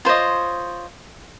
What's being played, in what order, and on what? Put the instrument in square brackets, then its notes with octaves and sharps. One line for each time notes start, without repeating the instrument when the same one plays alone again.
[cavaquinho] F4 C5 C#5 D#5